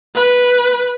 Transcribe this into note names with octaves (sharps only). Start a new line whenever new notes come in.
B4